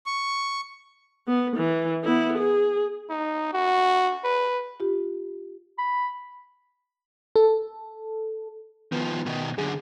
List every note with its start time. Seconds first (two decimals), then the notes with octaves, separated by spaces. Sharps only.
0.06 C#6
1.28 B3
1.57 E3
2.04 B3 E4
2.38 G#4
3.09 D#4
3.53 F#4
4.24 B4
4.80 F4 G4
5.79 B5
7.36 A4
8.92 D#3 F3 B3
9.26 B2 D#3
9.58 F#2 D3 G#4